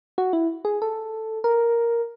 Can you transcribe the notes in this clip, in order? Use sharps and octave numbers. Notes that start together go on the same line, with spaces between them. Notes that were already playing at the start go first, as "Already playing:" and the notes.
F#4
E4
G#4
A4
A#4